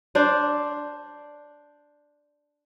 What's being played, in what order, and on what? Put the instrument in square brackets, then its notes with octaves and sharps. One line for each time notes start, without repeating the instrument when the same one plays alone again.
[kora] D4 C5 D5